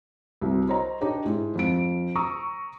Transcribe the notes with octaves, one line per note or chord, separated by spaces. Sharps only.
C2 F#4
C5 C#5 D#5 A#5
D4 D#4 G4 C#5 D#5
G#2 E4
F2 D7
A#5 C#6 D#6 E6